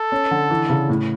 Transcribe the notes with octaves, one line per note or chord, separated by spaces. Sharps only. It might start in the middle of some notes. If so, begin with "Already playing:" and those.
Already playing: A4
C#4
D3
E3
C#3
A2